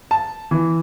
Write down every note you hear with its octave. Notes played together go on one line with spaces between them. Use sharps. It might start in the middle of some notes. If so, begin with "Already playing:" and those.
A5
E3